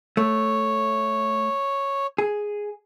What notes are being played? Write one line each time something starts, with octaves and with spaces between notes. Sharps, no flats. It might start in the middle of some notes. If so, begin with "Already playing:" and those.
A3 C#5
G#4